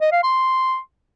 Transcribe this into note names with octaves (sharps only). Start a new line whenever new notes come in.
D#5
F5
C6